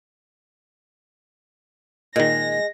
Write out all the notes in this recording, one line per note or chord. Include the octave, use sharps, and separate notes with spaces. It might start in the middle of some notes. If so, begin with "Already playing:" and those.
A#2 D#3 G#3 A#6